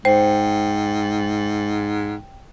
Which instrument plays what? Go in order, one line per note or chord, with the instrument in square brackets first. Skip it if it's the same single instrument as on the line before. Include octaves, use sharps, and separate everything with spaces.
[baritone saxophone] G#2 [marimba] C5 [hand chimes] G5